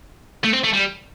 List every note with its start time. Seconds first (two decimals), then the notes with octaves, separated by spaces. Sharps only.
0.44 A3
0.53 C4
0.64 A3
0.73 G3